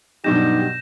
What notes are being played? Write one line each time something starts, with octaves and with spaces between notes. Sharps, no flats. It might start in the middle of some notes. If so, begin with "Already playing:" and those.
G2 B2 F#3 D#4 G4 G6 A#6 E7